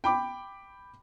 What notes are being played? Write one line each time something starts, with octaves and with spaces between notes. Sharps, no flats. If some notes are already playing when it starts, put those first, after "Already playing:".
G5 B5 D6